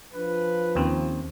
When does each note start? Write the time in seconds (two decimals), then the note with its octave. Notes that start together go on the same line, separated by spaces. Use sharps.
0.14 F3 D4 B4
0.75 D#2 C4 C#4